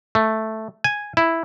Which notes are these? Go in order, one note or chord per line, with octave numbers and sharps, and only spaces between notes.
A3
G#5
E4